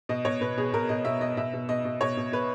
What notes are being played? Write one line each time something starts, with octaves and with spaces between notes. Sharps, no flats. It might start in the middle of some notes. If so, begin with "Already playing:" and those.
B2 D#5
B2 C#5
B2 B4
B2 G#4
B2 A#4
B2 D#5
B2 E5
B2 D#5
B2 E5
B2
B2 D#5
B2
B2 C#5
B2
B2 B4